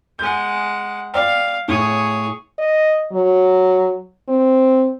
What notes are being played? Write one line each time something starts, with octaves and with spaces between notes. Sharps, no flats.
G#3 F#5 G#5 G6
D5 F5 G5
A2 G#4 C#5
D#5
F#3
C4